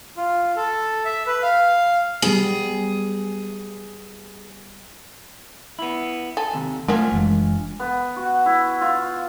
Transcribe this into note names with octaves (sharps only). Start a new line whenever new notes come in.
F4
A4
E5
B4
F5
G3 B3 G#4
B3 E4
A4 G#5
D#2 C3
F3 G#3 A3 D4 F4 F#4 A#4 G#5
F#1 E3 G#3
B3
F#4
E4
F4